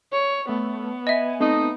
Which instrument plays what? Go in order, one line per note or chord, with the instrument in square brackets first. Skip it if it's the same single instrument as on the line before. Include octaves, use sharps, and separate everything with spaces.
[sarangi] C#5
[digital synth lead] A3 [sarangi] B3
[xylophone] D#5 E5 [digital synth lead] G#5
[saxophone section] A3 D#4 [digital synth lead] C4